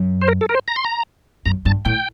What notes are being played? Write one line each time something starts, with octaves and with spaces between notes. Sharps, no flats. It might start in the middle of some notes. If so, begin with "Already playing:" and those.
Already playing: F#2
C5
A#4
A4
A#4
C5
A#5
C6
A#5
F#2 A#5
G2 A5
A2 G5